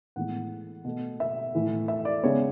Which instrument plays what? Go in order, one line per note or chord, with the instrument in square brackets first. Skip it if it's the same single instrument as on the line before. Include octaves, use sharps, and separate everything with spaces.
[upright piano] A2 E3 G#3 B3 F#5
B2 A3
E5
A2 E3 A3
E5
D5
C#3 G#3 B3 C#5